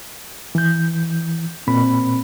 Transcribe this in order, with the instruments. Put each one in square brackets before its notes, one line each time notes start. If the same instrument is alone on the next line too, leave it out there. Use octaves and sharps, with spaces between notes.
[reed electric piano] E3 G6
[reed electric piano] A#2 B5 [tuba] C4